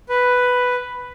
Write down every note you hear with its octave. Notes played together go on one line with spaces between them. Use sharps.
B4